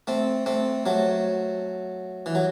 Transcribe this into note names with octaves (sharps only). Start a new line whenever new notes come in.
A3 C4
A3 C4
F#3 A3
E3
F#3